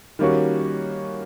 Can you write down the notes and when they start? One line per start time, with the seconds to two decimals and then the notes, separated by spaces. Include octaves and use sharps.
0.19 D#3 G3 A#3 C#4 F#4